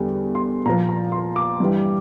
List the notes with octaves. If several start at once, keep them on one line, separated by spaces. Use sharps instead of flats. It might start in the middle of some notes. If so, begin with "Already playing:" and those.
Already playing: E2 D3 G3
C6
A#2 F3 A#5
A#5
C6
D6
G2 E3 G3